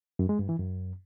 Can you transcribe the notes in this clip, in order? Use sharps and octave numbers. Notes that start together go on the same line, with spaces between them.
F#2
G#3
G2
E3
F#2